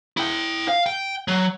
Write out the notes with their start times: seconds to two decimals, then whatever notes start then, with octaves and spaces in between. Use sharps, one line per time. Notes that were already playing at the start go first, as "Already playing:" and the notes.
0.17 E4 G5
0.68 F5
0.86 G5
1.28 F#3